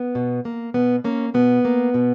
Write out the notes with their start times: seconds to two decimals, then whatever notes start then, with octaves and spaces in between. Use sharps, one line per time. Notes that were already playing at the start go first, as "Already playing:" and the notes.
Already playing: B3
0.15 B2
0.45 A#3
0.74 B2 B3
1.04 A#3 C#4
1.34 B2 B3
1.65 A#3
1.94 B2